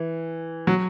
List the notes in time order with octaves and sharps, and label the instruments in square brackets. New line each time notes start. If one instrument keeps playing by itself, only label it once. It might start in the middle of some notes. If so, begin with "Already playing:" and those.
Already playing: [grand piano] E3
F#3